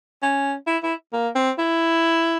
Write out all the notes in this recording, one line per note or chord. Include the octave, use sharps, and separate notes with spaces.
C#4
E4
E4
A#3
C4
E4